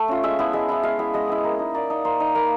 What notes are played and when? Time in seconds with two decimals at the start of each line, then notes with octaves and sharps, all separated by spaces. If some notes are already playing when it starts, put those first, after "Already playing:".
Already playing: A3
0.08 C#4 F4
0.23 G#3 E5
0.39 B3 E4
0.53 G#3 E5
0.69 B3 E4
0.83 G#3 F5
0.99 B3 E4 E5
1.14 G#3 D#5
1.29 B3 E4
1.44 A#3
1.59 D#4
1.74 A#3 D5
1.90 D#4
2.05 A#3 C5
2.20 D#4
2.35 A#3 B4